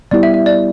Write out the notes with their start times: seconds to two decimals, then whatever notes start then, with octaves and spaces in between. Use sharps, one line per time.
0.11 G3 B3 E4 G4 D5
0.23 E5
0.34 E5
0.46 D5